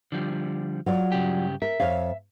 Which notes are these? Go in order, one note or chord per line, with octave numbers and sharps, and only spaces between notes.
D3 F3 G3
F#3 F4 D5
G2 C#3 G4
A#4 E5
F2 C#5 F5